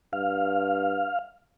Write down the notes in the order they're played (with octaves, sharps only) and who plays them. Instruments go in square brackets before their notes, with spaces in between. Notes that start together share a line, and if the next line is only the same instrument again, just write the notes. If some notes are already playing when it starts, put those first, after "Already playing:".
[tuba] G2 [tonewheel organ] F5